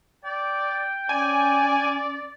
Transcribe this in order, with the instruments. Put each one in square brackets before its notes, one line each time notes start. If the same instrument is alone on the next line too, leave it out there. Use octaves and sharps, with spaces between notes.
[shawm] D5 [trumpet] G5
[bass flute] C#4 [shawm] D5 [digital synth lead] G#5